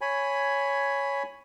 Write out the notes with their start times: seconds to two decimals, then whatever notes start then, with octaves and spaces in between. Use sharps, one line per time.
0.01 C#5 G#5 B5